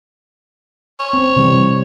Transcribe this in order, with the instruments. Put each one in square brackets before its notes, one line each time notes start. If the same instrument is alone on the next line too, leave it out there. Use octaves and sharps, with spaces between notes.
[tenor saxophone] C#5
[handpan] C4
C3 E3 G3